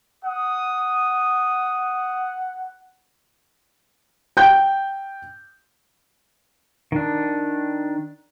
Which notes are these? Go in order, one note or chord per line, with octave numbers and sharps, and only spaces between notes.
F#5 D#6
G5 G6
D#3 D4